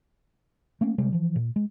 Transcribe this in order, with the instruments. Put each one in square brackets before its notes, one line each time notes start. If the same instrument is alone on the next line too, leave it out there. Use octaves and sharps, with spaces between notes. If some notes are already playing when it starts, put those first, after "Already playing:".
[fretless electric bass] A3 A#3 C#4
C3 G3 G#3
E3 F3
A#2
G#3